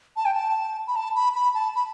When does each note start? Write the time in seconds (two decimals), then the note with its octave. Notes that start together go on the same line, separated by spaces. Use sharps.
0.16 A5
0.25 G5
0.34 A5
0.87 B5
0.95 A5
1.15 B5
1.35 B5
1.54 A5
1.75 B5